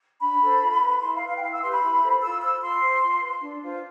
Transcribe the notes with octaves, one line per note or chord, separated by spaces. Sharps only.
D4 B5
A4 C5
F4
B4
E4 C6
F5
B4
F5
G5
E4 F5
E6
G4 B4 C6
B5
E4
A4 C5
F4 E6
C5 E6
F4 C6
C5
F4
B4
D4
F4 C5